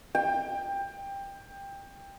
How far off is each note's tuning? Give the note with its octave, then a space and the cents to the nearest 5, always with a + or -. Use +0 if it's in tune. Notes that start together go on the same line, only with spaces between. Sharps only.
G5 +20